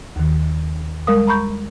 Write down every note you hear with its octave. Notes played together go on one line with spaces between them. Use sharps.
D#2 D#3
G3 G#3 A#4 F5 D#6
A#5 B5 C#6 G6